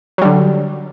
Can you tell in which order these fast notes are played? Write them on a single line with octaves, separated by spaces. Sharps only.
F#3 G3 D3